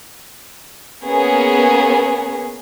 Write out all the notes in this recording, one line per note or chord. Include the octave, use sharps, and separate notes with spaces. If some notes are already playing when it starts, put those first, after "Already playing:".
A#3 B3 C#4 G#4